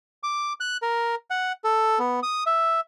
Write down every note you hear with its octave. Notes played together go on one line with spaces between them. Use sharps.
D6
F#6
A#4
F#5
A4
B3
D#6
E5